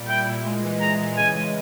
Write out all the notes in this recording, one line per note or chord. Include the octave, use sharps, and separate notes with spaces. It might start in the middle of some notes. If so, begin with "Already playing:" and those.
Already playing: A#2 G3
E4 G5
A#2
G#3
E3
G#3 A#5
E3
C#3 G#5
G#3